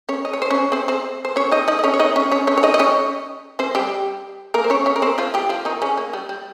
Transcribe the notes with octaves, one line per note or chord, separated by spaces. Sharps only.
C#4 C#5
D#5
C#5
C5
C#4 C#5
C4 C5
C4 C5
C5
C#4 C#5
D#4 D#5
D#4 D#5
D#5
C#4 C#5
C#5
D#4 D#5
C#4 C#5
C#4 C#5
C#4 C#5
C#5
D#4 D#5
D#5
C#4 C#5
C4 C5
G3 G4
A#3 A#4
C5
C#4 C#5
C#4 C#5
A#4
C4 C5
F3 F4
G3 G4
F3 F4
D#3 D#4
C#3 C#4
A#3
G3
G3